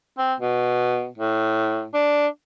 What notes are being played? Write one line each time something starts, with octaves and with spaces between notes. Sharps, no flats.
C4
B2
A2
D4